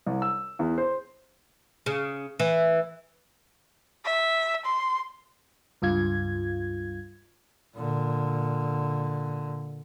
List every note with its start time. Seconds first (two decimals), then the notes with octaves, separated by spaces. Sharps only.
0.06 C2
0.22 E6
0.59 E2
0.78 C5
1.86 C#3
2.40 E3
4.05 E5
4.66 C6
5.82 C#2 G2 F4 G#6
7.75 A#2 D3